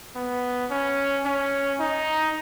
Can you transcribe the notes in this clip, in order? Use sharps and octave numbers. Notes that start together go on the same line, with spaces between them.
B3
C#4
C#4
D#4